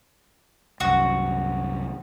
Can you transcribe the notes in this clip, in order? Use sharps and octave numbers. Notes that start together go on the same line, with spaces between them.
C2 F#2 F#4